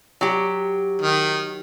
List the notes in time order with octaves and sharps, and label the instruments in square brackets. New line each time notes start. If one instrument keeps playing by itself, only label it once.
[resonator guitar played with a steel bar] F#3 G4
[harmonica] D#3